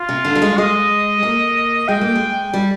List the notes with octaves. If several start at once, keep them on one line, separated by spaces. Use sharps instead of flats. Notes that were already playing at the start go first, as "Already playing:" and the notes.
Already playing: F4
C3
D3
G3
G#3
G#3 D#5
A#3
G#3 G5
A#3
G#3
G3